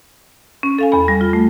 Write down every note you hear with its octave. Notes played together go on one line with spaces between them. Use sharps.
C#4
A4 F5 G#5
E2 B5
G3
F4
A3